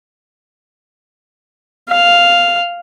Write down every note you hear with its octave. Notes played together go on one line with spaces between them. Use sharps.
F5